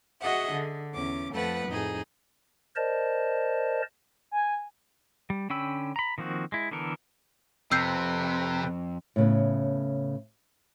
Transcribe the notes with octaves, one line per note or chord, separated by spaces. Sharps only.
F#4 G#4 D#5 E5 F#5
D3
E2 C#4 D6
F2 F3 A3 B4 F#5
F2 A2 D#4 G#4
A#4 C5 D5 D#5 A5
G#5
G3
D3 C#4 G5 B5 E6
A#5 B5
D#3 F3 A#3 C4 F#4
G#3 E4
D3 E3 B3 A4 A#4
F2 C3 A4 B4 G5 E6 G6 C7
A2 C#3 B3